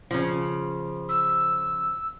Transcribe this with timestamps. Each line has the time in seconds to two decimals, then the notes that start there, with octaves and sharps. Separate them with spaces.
0.11 C#3 F3
1.09 E6